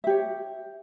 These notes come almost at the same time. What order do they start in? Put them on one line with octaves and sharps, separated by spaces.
E5 G4 C#5